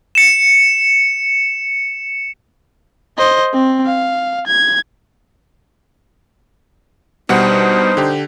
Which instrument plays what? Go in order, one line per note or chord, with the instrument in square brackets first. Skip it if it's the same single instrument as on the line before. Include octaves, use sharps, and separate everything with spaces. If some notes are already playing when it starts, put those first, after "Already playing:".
[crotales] C#7 E7
[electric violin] C5 D#5
C4
F5
G#6
[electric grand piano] B2 G3 F#5 [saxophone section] D4 D#4 C5
[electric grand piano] D3 G4